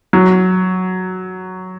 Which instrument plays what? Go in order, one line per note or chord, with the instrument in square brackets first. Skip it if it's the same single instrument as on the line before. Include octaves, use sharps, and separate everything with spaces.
[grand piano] F#3